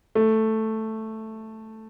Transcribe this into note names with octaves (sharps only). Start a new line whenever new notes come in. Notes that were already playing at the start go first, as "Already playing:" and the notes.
A3